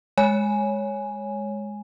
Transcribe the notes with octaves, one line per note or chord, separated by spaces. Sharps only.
G#3 C#5 G#5